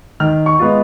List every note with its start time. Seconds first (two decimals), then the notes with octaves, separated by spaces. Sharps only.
0.20 D#3 F6
0.46 C#6
0.59 G#3 B3 F4